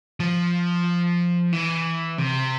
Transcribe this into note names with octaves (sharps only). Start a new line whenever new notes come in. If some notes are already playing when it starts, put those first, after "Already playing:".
F3
E3
C3